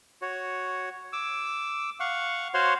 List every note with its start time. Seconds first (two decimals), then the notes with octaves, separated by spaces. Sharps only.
0.22 F#4 C#5
1.13 D6 E6
2.00 F5 F#5 C#6
2.54 F#4 C5 C#5 F5 F#5 C6